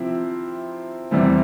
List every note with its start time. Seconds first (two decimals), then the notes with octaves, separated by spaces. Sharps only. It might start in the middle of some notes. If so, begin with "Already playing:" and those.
Already playing: C3 F3 C4 E4
1.11 E2 C3 E3 G3 C4